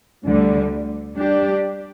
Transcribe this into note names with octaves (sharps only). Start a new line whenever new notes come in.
D2 D3 G3
G3 D4 G4